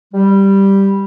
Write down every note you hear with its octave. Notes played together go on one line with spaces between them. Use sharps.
G3